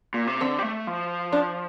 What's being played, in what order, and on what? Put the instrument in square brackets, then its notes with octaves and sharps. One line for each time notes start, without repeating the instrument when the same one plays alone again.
[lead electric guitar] A#2
C3
[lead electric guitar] D3 [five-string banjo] C4
[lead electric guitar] G3
A3
F3
[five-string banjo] D4